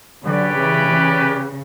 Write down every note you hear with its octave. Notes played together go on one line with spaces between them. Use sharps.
D3 F#3 C#4 G4 B4 D5
C#3 E3
C#3